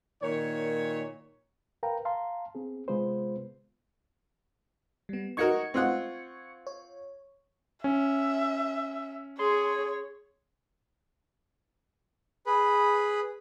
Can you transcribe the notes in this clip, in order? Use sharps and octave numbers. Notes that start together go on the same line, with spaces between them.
A#2 D#3 C#5
A#4 B4 F5 G5 A#5
F5 A5 A#5 C6
B3 C4 G#4
C3 G#3 B3 F4 B4 C5
G3 B3
D#4 F#4 A#4 C#6 G#6 C#7
C4 F4 F#5
C#5
C#4 E5
G#4 C#5 C6
G#4 B4 B5